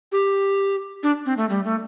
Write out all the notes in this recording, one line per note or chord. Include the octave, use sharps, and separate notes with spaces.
G4
D4
C4
A3
G3
A3